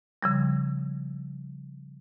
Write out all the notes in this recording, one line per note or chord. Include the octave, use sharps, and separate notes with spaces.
C#3 F3 G3